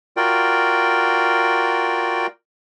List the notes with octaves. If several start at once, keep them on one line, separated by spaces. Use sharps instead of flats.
F4 F#4 A#4 D5 G5